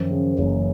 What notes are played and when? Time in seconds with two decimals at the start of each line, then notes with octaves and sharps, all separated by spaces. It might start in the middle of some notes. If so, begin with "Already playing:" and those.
Already playing: F#2 D#3 F3
0.11 C#3
0.38 F#1 E3 F#3